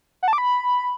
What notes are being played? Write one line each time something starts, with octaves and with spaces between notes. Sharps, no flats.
F#5
A5
D6
B5